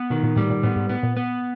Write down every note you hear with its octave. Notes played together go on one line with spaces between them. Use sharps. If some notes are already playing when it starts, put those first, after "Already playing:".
Already playing: B3
B2 D#3
A#2
A2 G3
A#2
A2 B3
G#2
A2 B3
A#2
B3